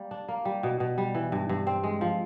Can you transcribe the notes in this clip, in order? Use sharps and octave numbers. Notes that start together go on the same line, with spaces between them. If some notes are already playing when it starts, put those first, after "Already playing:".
Already playing: G3 A#3
D4
A#3
G3
B2
B2
G3
E3
G2
G2
C4
G#3
F3